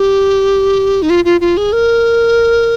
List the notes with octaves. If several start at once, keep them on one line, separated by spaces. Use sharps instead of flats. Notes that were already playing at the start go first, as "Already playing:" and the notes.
Already playing: G4
D#4
F4
F4
F4
G#4
A#4